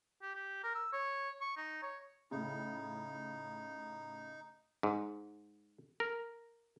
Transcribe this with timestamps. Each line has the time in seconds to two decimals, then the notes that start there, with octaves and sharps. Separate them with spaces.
0.22 G4
0.35 G4
0.63 A#4
0.75 E6
0.92 C#5
1.41 C#6
1.57 D#4
1.82 C#5
2.31 A2 C#3 D#4
4.83 G#2
6.00 A#4